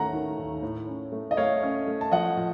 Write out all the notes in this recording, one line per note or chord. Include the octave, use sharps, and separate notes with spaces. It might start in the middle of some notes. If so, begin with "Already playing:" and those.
Already playing: D#2 A3 C#4 F#5 A#5
D#3
D#2
A2
C#4
A3
D#5
A3 C#5 F5
C#4
A3
A5
F3 D#5 F#5
F3